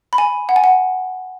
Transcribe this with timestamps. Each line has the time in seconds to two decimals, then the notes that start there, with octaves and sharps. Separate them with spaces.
0.13 B5
0.18 G#5
0.49 F#5
0.56 G#5
0.64 F#5